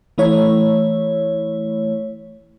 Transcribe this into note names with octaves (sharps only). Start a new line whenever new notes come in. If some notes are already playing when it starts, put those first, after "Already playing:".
E3 A3 E4 C#5